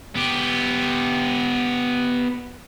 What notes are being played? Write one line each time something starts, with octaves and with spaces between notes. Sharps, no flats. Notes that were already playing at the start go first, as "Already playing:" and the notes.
B3 G4